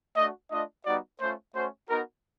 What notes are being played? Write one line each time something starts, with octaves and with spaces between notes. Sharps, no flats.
A3 D4 F#4 D#5
A3 D4 F4 D#5
G3 B3 D#4 F#4 D5
A3 C#4 F4 C5
A3 C#4 F#4 C5
B3 D#4 F#4 A#4